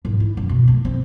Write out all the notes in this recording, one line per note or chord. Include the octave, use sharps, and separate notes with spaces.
G#2
E4
F#2
B2
A3
C4